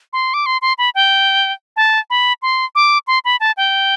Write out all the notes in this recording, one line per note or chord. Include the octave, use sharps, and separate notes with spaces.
C6
D6
C6
C6
B5
G5
A5
B5
C6
D6
C6
B5
A5
G5